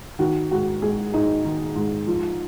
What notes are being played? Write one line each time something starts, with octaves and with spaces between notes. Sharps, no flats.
D#3 F#4
G#2 F#4
G#3 G#4
G#2 D#4
D#3
G#2
F3